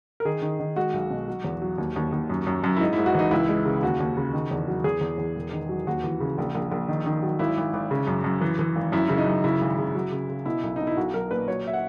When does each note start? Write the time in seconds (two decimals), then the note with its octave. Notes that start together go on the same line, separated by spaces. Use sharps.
0.20 A#4
0.25 D#3 G#4
0.42 D#3
0.60 D#3
0.76 G#3 F#4
0.94 B1
1.10 B2
1.28 F#3
1.44 E2
1.62 F#3
1.78 D#2
1.96 D#2
2.12 D#2
2.30 F#2
2.47 F#2
2.64 F#2
2.76 E4
2.81 G#2 D#4
2.93 G#2 E4
3.06 F#4
3.15 E3 D#4
3.31 C#2 E4
3.49 G#3
3.65 C#3
3.82 D#2 F#4
4.00 D#2
4.17 C#3
4.33 D#3
4.51 E2
4.68 F#3
4.84 E2 G#4
5.01 E2
5.18 E2
5.35 E1
5.53 D#3
5.69 F#3
5.87 D#2 F#4
6.04 E3
6.20 C#3
6.38 A#1
6.55 A#1
6.72 A#1
6.88 D#3
7.06 D#3
7.23 F#3
7.39 G#1 E4
7.57 G#1
7.73 G#1
7.91 C#3
8.07 F#2
8.24 F#2
8.41 E3
8.59 E3
8.75 G#1
8.92 F#2 E4
9.08 C#3 E4
9.18 D#4
9.26 F#2
9.44 C#3 E4
9.61 G#1
9.78 C#3
9.95 F#3
10.12 C#3
10.29 C#3
10.45 B2 E4
10.63 B1
10.76 B2 D#4
10.87 E4
10.97 B1 F#4
11.13 F#3 A#4
11.31 A#2 B4
11.48 F#3 C#5
11.67 E5
11.73 F#5